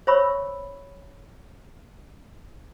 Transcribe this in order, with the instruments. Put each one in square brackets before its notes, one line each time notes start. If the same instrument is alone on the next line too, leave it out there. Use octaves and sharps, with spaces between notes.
[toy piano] C5 C#5 E5 B5 C#6 E6